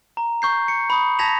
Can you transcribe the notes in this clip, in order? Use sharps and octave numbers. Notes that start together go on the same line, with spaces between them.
A#5
C#6 G6 C7
C#7
B5 D#6
A5 G#6 A#6 B6 F7 F#7